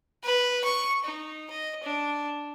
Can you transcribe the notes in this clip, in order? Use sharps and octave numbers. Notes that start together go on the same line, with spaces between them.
B4
C#6
D#4
D#5
D4